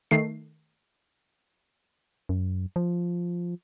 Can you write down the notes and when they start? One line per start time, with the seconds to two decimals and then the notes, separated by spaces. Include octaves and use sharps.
0.11 D#3 A3 C7
2.29 F#2
2.76 F3